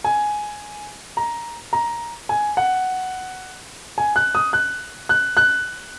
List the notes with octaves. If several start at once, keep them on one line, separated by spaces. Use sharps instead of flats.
G#5
A#5
A#5
G#5
F#5
G#5
F#6
D#6
F#6
F#6
F#6